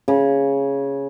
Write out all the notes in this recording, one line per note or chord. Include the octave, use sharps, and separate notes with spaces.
C#3